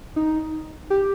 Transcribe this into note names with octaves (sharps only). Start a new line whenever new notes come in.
D#4
G4